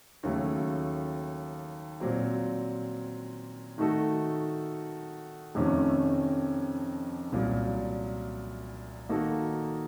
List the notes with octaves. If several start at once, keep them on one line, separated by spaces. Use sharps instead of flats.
D#2 C#3 F#3 A3
A#2 F#3 C4
D#3 A3 D#4 F#4 A4
F2 C3 D#3 A3 C#4
C2 A#2 F#3
D#3 A#3 D#4 F#4 A4